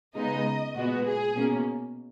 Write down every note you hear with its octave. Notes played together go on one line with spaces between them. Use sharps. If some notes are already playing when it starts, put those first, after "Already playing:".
C#3 G#3 B3 D#4 D#5
A#2 G#3 B3 F#4
G#4
B2 A#3 C#4